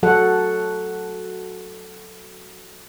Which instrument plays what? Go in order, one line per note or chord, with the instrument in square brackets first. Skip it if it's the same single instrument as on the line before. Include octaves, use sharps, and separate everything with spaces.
[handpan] F#3 F#4 A4 F#5